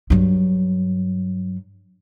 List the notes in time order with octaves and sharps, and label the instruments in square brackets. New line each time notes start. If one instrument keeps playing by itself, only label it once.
[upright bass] G2 F#3